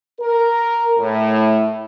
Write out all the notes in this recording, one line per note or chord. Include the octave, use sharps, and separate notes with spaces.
A#4
A2